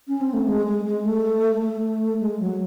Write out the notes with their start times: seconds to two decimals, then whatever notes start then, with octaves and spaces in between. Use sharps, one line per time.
0.08 C#4
0.21 C4
0.33 A3
0.47 G#3
0.66 G#3
0.85 G#3
1.05 A3
1.62 A3
2.20 G#3
2.39 F#3